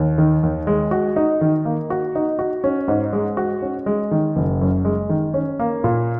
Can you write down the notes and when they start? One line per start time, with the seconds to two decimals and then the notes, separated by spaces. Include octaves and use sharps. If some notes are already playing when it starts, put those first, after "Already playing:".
Already playing: D#2
0.18 D#3
0.43 D#2
0.67 G#3
0.91 F#4
1.16 D#4
1.41 D#3
1.65 A#3
1.90 F#4
2.15 D#4
2.39 F#4
2.64 C#4
2.88 G#2
3.13 G#3
3.37 F#4
3.62 C#4
3.86 G#3
4.11 D#3
4.36 F#1
4.61 F#2
4.85 G#3
5.09 D#3
5.34 C#4
5.59 A#3
5.84 A#2